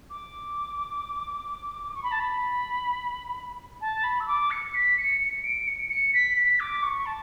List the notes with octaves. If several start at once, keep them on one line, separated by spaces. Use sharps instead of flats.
D6
C#6
B5
A5
B5
A5
B5
E6
D6
C#7
B6
C#7
C#7
D7
C#7
C#7
B6
B6
D6
C#6
A5